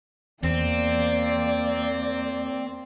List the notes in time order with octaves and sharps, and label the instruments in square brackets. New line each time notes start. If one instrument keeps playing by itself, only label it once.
[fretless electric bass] E2 [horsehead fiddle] A#3 D5 [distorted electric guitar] C4